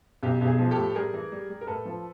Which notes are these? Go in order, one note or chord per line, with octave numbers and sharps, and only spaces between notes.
B1 G4
B1
G#4
F3
G4 A4
A2
G3 G#4 A#4
E3
G3
G3
A#4
A2 A4 B4
F3